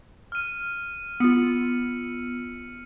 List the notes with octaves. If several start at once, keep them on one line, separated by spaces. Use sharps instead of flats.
F6 D#7
B3 F4 E6 B6 C#7